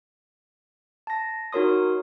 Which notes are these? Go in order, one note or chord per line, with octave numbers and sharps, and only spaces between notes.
A5 A#6
D#4 F#4 A#4 C#5 C6 D#6